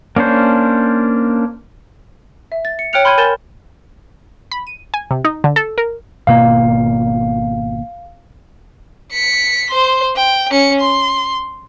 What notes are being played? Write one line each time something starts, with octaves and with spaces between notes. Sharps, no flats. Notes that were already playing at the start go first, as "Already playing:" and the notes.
A#3 C#4 D4 C5
E5
A6
C#7
C#5 G5 F6 F#6 C#7 F7
B5 C6 F6 G6 G#6 D#7
A#4 G#5 G6 A6 E7 G7
B5
D#7
G#5
C3
D#4
D3
A4
A#4
G#1 B2 A#3 F5
B6 C#7
C5 C6
G5
C#4 C#7
C6